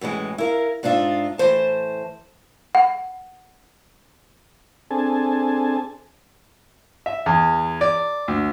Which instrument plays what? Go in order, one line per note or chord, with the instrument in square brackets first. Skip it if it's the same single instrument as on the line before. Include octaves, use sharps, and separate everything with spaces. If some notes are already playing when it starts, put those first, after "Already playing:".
[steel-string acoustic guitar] F#2 A2 E3 G#3
E4 A#4 F5
G#2 D4 D#4 F4 E5
A2 E3 C5 A5
[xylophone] F#5
[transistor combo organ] C4 D4 G#4 A4 G#5 A5
[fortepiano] E5
E2
D5
D2